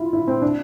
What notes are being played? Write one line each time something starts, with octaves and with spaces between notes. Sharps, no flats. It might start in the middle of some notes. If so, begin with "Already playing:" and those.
Already playing: E4 F4
E4
C4
D4